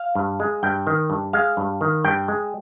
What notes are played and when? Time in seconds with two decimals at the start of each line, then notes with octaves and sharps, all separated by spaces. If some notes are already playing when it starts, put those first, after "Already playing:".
Already playing: F5
0.15 G2
0.40 G#3
0.63 G2 G5
0.87 D#3
1.10 G2
1.33 G#3 F5
1.57 G2
1.81 D#3
2.04 G2 G5
2.28 G#3